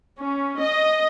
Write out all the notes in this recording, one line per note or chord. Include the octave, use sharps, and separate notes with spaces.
C#4
D#5